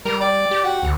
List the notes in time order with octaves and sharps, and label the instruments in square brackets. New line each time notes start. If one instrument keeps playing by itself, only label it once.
[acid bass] G3 [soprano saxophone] A#4
[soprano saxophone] D5
[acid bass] G4
[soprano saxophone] F#4
[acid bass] D2